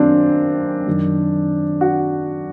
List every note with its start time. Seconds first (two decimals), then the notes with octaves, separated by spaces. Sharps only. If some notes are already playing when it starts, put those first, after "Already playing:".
Already playing: F#2 D#3 A#3 C4 D4
0.87 F#2 D#3
1.81 F#4